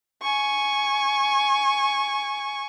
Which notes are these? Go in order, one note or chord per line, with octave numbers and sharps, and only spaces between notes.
G#5 C#6